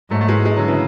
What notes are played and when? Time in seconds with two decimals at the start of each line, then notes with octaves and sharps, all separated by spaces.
0.10 G#2 F#3 A3
0.21 A3
0.29 E3 G#3
0.45 E3 G#3
0.57 D3 F#3
0.68 C#3 E3